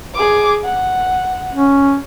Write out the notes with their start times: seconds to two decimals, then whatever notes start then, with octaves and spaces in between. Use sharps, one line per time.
0.14 G#4 D6
0.64 F#5
1.53 C#4